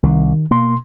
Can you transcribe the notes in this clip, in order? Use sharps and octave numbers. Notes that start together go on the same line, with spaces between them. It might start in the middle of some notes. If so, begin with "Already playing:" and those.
C2 D#3
B2 A#3 C6